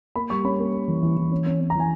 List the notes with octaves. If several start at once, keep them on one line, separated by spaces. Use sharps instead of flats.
A#3 B5
G3 C#6
C#4 B5
A#3
A#3
E3
E3
E3
C#4
C#4
C#4
A#5
E3 G#5